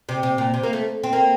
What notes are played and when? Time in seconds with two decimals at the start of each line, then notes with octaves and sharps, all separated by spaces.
0.09 C3
0.23 C3
0.38 A#2
0.54 C3
0.63 A#3
0.73 A3
1.04 C4
1.13 A#3